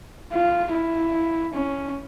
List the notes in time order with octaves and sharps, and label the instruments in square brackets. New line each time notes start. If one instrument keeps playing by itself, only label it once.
[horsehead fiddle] F4
E4
C#4